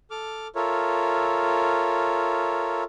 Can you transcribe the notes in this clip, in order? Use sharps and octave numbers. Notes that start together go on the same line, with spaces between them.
A4 D6 F6
F4 A4 A#4 C#5 E5